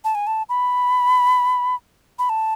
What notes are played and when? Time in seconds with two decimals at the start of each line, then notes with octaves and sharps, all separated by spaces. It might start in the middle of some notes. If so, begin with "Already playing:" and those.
0.04 A5
0.15 G#5
0.27 A5
0.49 B5
2.19 B5
2.29 A5